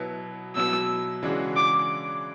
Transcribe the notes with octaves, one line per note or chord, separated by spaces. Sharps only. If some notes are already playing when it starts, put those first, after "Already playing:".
Already playing: B2 F#3 B3 E4
B2 F#3 B3 E4 E6
C#3 E3 G#3 D4 F#4
D6